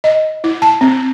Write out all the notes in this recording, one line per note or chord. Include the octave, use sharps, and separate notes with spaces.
D#5
E4
A5
C4